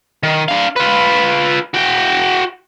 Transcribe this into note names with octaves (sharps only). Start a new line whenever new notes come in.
D#3
D4 F5
F4 B4
F#4 G5